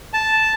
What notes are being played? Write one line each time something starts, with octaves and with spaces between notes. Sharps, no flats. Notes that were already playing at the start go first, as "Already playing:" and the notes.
A5